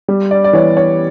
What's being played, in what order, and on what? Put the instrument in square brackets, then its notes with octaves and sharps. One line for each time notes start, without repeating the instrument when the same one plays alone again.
[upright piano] G3
D5
D5
E3 C#5
C#5